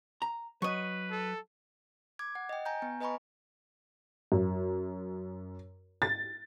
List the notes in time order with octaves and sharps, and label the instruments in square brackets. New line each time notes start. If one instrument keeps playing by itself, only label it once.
[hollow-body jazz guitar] A#5
[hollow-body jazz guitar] F#3 [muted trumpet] B4 [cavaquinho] D#5 C#6
[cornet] A4
[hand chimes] D6 G#6
F#5
D#5 G5
G#5 A#5 G6
B3
B4 D#5 G#5 A#5 B5 C#6
[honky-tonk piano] F#2
A6